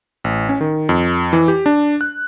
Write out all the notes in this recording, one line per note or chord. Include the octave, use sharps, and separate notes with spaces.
A1
C#4
D#3
F2
E3
G4
D4
F#6